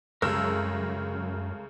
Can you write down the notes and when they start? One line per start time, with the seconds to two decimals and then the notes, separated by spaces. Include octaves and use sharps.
0.22 C2 F#2 C#3 G#3 A4 A#4 E6